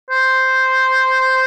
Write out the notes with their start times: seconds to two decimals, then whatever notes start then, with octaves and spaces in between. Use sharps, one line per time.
0.10 C5